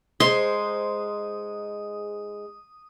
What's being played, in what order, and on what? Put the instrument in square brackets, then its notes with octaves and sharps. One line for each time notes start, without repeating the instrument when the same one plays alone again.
[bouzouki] G#3 D#4 C5 [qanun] C6 [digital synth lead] D#6